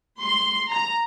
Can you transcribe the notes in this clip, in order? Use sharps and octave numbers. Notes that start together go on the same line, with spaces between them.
C6
A#5